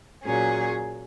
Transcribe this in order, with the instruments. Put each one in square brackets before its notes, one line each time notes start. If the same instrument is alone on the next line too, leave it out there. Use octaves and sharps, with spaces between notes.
[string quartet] A#2 F#3 C#4 G#4